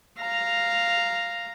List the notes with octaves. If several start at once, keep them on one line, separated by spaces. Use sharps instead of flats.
F5 A#5